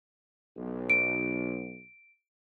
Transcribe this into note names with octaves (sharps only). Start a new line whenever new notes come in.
B1
D7